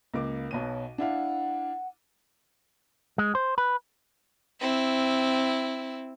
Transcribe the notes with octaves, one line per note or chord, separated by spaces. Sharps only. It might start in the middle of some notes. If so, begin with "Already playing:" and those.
C#2 A#3 D6
B1 B2 C#5 D#7
D4 E4 F5 F#5
G#3
C5
B4
C4 E4